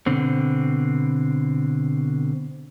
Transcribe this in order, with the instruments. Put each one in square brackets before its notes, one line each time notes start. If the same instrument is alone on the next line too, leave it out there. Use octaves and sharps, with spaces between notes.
[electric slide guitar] B2 D3 C4